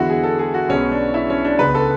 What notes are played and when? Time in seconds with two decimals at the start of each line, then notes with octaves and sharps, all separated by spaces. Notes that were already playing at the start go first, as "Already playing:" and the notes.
Already playing: E2 D3 G#3 B3 E4 F#4
0.10 G#4
0.23 A4
0.39 G#4
0.54 F#4
0.69 B1 B2 G#3 B3 C#4
0.92 D4
1.14 E4
1.30 C#4
1.45 D4
1.59 C#2 C#3 G#3 B3 B4
1.75 A4